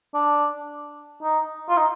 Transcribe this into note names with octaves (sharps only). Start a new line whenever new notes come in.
D4
D#4
F4
D#4